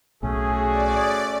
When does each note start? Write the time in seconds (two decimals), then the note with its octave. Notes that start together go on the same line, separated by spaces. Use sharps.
0.23 B1 A2 A3 C#4 F#4 G#4
0.69 D5